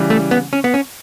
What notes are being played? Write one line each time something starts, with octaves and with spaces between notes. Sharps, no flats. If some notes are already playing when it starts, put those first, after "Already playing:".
Already playing: C#3 E3 G3
A3
B3
C#4
B3
C#4